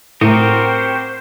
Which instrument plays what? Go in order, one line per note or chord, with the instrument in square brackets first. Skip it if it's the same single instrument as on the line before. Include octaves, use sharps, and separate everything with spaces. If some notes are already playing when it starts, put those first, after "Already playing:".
[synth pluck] A2 D#6 [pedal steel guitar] C4 F#4 G4 [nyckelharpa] A#4 [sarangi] C5